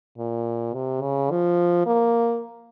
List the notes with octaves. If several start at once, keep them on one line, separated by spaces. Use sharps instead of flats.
A#2
C3
C#3
F3
A#3